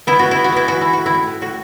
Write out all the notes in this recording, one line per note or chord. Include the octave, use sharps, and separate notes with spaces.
B3 E4
B3 F#4
B3 E4
F#4
B3 E4
E3 F#4
E3 E4
A2 F#4
E4
A2
A2
A2 F#4